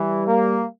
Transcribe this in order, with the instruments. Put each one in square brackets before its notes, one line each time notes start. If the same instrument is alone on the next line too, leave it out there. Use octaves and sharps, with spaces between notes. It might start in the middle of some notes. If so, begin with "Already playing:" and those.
Already playing: [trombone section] E3 [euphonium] G3
[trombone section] A#3